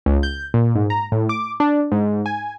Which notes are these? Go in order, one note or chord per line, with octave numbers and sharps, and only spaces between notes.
C#2
G6
A#2
G#2
A#5
A2
D6
D4
G#2
G#5